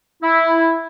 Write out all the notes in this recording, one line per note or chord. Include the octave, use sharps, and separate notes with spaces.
E4